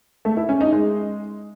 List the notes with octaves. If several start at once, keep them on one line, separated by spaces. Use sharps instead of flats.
A3
E4
C#4
D#4
G#3